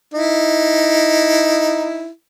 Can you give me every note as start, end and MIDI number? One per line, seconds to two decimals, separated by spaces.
0.14 2.09 63
0.14 2.09 64